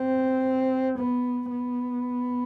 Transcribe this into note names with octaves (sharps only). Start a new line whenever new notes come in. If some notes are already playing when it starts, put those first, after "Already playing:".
Already playing: C4
B3
B3